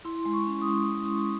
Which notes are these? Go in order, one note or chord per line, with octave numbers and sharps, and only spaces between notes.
E4 C6
G#3
C#6
C#4
D#6
G#3